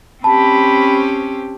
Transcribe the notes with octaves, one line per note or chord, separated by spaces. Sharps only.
C4 C#4 G4 A5 B5